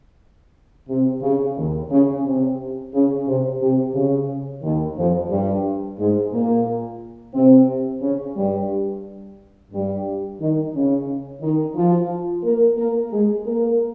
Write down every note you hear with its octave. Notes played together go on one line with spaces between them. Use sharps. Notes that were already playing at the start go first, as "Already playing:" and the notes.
C3
C#3
D#2 D#3
C#3
C3
C#3
C3
C3
C#3
D#2 D#3
F2 F3
G2 G3
G#2 G#3
A#2 A#3
C3 C4
C#3 C#4
G2 G3
G2 G3
D#3 D#4
C#3 C#4
D#3 D#4
F3 F4
A#3 A#4
A#3 A#4
G#3 G#4
A#3 A#4